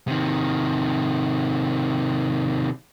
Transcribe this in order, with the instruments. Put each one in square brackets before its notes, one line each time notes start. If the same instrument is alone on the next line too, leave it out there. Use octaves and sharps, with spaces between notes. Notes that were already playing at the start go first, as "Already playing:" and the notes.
[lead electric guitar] C3 D#3